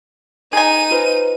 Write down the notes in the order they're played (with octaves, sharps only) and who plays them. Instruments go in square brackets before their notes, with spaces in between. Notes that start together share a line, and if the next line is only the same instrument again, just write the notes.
[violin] D#4 D#7 [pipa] G#4 G#5
[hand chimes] F4 B4 C5